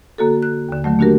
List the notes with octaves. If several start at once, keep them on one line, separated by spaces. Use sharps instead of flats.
D3 A#3 F#4 A4
F#6
D#2 D3
D3 D#3 F#3 A3
A#3 D4 F#4 G4 A#4